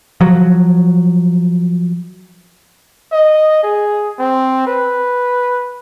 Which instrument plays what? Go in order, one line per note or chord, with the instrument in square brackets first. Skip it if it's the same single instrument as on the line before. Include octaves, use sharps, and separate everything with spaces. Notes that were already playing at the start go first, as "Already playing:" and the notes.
[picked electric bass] F3 F#3
[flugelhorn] D#5
G#4
C4
B4